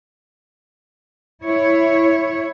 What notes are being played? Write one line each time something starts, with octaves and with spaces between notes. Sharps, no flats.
E4 C#5